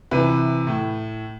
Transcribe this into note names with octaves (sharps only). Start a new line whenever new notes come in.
C3 E3 B4
A2